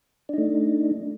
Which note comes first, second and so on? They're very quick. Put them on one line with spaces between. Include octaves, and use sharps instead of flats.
D4 D#4 A3